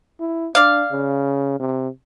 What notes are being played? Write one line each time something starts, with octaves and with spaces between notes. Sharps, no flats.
E4
D4 D5 F5
C#3
C3